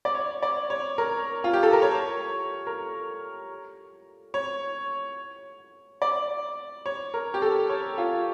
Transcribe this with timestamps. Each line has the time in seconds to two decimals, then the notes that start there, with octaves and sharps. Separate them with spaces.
0.05 D5
0.15 C#5
0.43 D5
0.70 C#5
0.98 A#4
1.44 F4
1.53 G4
1.63 A4
1.73 A#4
1.82 C#5
2.67 A#4
4.34 C#5
6.02 D5
6.86 C#5
7.14 A#4
7.34 G4
7.42 A4
7.69 C#5
7.98 F4